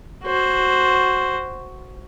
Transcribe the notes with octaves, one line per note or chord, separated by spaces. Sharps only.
F#4 C5